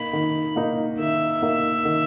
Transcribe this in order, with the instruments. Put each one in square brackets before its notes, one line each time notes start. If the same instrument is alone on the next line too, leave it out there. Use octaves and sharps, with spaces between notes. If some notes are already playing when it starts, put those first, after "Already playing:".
Already playing: [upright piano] A#3 D#4 [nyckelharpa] B5
[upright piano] D#3
A#3 D#4
[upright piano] D#3 [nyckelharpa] E5
[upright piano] A#3 D#4
D#3